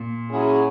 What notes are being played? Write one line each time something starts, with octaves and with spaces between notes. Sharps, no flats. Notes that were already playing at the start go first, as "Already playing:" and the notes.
Already playing: A#2
F#3 C#4 E4 G#4